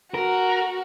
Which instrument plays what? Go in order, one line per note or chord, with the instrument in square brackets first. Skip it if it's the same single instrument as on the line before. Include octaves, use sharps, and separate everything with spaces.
[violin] F#4 [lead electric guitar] A#4